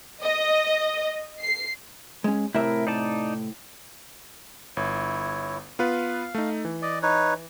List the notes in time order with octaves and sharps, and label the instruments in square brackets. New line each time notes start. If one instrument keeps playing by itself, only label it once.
[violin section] D#5
C7
[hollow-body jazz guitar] G#3 C#4
[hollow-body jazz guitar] A2 C3 E5 [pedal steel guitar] E4 A#4
[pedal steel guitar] D#4 D5 A5
[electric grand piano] G1 [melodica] E4 C#5
[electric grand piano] B3 F4 B4 [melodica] F5
[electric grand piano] A3 D#4
E3
[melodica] D5 D#5
D#4 B4 C#5